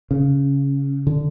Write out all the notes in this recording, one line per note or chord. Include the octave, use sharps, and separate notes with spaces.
C#3
D3